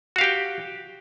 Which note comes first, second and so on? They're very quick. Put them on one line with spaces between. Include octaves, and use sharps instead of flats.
F#4 F5 G4 G5